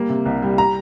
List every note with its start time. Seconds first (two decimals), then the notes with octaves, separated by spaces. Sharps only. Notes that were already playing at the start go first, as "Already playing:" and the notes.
Already playing: G3 A#3
0.09 C3
0.26 C2
0.42 G3
0.58 A#5